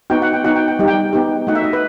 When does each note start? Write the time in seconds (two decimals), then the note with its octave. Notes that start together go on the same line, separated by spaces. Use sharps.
0.10 B3 D#4 F#4 G5
0.22 F#5
0.33 G5
0.44 B3 D#4 F#4 F#5
0.56 G5
0.68 G5
0.79 G3 D#4 G4
0.88 G5
1.13 B3 D#4 G4
1.47 A3 D#4 F#4 F#5
1.55 E5
1.64 D#5
1.73 B4